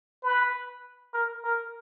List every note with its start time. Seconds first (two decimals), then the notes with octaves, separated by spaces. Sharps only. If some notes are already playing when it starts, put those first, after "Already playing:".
0.23 B4
1.13 A#4
1.44 A#4